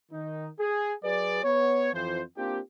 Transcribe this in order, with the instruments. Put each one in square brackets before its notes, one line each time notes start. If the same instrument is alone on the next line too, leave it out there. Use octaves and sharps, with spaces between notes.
[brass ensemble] D#3 D#4
G#4
F#3 G#4 B4 D5
B3 C#5
F2 E3 F3 C5
A#3 C4 D4 F4 G4